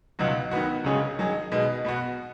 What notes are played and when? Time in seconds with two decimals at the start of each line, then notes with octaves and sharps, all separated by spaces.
0.19 C#2 B2 F#3 D#4 F#4
0.51 D#3 F#3 B3 F#4
0.84 C#2 C#3 G#3 C#4 G#4
1.18 D#3 F#3 D#4 G#4
1.52 B2 G#3 D#4
1.85 B2 B3 F#4